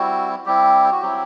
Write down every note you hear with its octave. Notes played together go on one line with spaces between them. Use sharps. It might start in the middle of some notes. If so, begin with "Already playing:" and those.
Already playing: G3 C4 E4 F#4
G3 C4 E4 G4
F#4
F#3 C4 E4 G4